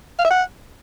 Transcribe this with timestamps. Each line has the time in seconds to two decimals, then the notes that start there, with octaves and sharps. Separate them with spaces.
0.19 F5
0.25 E5
0.30 F#5